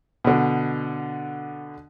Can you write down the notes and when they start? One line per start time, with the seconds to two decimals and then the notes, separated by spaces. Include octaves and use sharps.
0.25 B2 D3